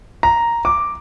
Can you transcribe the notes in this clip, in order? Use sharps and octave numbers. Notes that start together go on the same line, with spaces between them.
A#5
D6